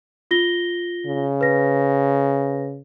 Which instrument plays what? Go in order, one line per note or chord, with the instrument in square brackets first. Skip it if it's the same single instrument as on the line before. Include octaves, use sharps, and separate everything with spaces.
[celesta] F4 A#6 G7
[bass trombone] C#3
[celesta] B4 A#6